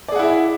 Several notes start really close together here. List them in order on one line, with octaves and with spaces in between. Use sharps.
D5 G#4 F#5 E4 E5